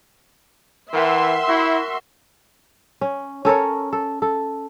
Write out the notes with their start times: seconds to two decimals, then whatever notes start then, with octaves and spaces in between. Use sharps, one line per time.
0.93 E3 A#4 E5 F#5 G5 C6
1.48 E4 F#4
3.01 C#4
3.45 C#4 A4 A#4 C#5
3.93 A4
4.22 A4